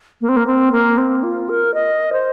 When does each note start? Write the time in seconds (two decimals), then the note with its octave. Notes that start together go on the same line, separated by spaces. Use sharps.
0.21 A#3
0.29 C4
0.37 A#3
0.47 C4
0.72 A#3
0.98 C4
1.23 F4
1.49 A#4
1.74 D#5
2.12 C5